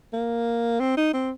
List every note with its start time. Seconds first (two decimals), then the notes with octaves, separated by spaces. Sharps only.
0.13 A#3
0.80 C4
0.97 D#4
1.14 C4